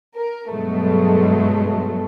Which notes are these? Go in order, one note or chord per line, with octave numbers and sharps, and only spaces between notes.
A#4
G2 B2 F#3 G#3 A3